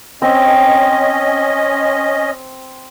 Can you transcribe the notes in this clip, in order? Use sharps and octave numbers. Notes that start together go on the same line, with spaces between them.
C4 C#4 D#5